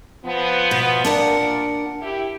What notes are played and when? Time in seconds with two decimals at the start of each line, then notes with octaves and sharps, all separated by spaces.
0.24 F3 B3
0.71 B2
1.05 A#2 D4 A#4 D5 F#5
2.01 E4 G4